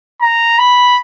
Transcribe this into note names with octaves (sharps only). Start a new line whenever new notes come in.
A#5
B5